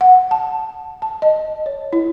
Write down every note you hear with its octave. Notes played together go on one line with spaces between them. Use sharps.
F#5
A5
A5
D#5
C#5
E4